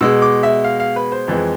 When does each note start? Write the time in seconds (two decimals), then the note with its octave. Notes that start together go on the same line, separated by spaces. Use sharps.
0.01 B2 G#3 E6
0.22 D6
0.43 E5
0.64 F5
0.80 F5
0.96 B4
1.12 C5
1.28 F2 E3 G#3